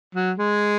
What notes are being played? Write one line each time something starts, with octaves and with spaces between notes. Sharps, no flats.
F#3
G#3